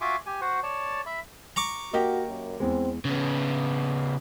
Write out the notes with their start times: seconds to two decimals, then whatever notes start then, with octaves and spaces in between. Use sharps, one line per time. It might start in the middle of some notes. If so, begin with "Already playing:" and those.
0.01 F4 F#4 E5 G#5 C6 D6
0.26 G4 G#5
0.41 F#4 C5 F#5
0.63 C#5 D5 A5
1.06 E5 B5
1.56 A#5 C#6 D6
1.93 A#3 F#4 G4 A#4 D#5
2.29 F#2
2.60 E2 G#3 C4
3.05 C#3 B3